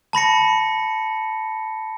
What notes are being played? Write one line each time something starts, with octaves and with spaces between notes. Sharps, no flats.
A5 B5 A#6 C#7